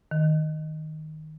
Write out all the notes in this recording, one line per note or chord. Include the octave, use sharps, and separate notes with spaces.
D#3